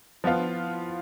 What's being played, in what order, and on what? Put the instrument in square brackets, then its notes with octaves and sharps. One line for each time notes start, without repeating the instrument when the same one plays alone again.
[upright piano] F3 B3 F4 [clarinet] E4
[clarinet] D4
E4